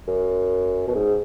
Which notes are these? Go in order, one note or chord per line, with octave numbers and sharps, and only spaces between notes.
F#2
B2
G#2